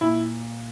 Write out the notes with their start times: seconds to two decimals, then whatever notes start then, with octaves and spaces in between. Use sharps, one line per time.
0.01 A#2 E4